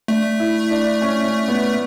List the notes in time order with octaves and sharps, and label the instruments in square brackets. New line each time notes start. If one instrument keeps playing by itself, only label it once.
[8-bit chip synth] A3 [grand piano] D4
[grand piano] E4
D4
C#4
C#4
B3